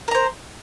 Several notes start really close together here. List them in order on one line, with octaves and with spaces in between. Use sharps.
A#4 A#5 C5